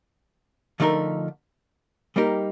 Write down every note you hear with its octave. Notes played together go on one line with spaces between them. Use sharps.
D3 F3 A3 D#4 A#4
G3 A#3 D#4 G4 A#4